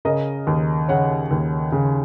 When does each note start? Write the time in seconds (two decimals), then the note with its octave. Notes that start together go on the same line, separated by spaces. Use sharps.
0.05 C#3 A#4 D#5
0.47 D#2
0.88 C#3 C#5 F#5
1.31 D#2
1.72 C#3